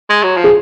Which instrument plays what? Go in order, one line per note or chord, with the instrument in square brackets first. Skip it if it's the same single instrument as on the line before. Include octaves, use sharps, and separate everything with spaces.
[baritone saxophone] G#3
F#3
F3
[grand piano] G#4